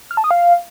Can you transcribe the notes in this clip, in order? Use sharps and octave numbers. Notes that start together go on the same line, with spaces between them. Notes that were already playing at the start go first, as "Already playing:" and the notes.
F6
A5
D#6
F5